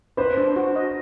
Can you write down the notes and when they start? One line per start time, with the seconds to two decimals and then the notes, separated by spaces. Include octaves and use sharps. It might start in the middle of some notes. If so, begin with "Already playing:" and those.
0.17 B4 C5
0.38 D4
0.56 F#4
0.76 D#5